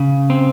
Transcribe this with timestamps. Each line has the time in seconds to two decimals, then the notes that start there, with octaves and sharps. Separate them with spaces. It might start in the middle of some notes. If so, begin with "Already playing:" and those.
Already playing: C#3
0.30 C4